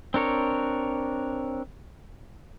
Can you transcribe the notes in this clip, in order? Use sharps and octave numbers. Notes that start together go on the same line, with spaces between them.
C4 D4 A#4 C#5